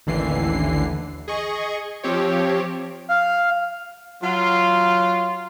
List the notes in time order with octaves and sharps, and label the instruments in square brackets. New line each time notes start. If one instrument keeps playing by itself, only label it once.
[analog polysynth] A1 D#2 D3 E3 C7
G#4 D#5 C#6
F3 C4 G4 C#5
[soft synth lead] F5
[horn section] F#3 F4